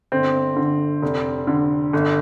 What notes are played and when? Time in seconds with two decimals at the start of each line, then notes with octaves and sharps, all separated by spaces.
0.12 G1 C4
0.57 D3
1.03 F1
1.47 D3
1.93 G1